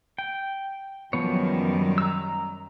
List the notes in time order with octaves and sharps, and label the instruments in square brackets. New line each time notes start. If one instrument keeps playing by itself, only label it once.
[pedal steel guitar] G5
[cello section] F#2 D#3 G3 [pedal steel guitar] F3 B3 C#5
[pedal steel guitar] A#5 E6